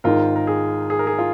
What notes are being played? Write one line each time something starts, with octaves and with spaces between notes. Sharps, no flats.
G#1 G#2 D#3 F4 A#4
A#4
G#4
G#4
A#4
G#4
F4